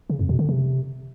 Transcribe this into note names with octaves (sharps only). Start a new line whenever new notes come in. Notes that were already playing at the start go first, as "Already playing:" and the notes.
C#3
F2
B2
D3
C3